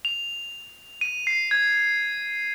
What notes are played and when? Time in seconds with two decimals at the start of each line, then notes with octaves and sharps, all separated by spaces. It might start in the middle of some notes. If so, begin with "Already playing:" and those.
0.05 F7
1.01 D#7
1.27 C7
1.51 G#6